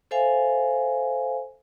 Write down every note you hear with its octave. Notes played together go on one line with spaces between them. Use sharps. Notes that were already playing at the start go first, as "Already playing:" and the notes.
A4 C5 E5 F5 G#5